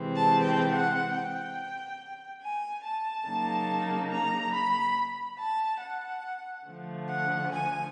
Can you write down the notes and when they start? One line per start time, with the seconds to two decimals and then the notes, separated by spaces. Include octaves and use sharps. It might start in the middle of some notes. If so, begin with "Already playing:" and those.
Already playing: C3 E3 G#3 C4
0.14 A5
0.42 G5
0.71 F#5
1.13 G5
2.41 G#5
2.84 A5
3.26 C#3 F#3 A#3 D#4
4.10 A#5
4.53 B5
5.38 A5
5.80 F#5
6.66 D3 F3 A3
7.08 F#5
7.51 G#5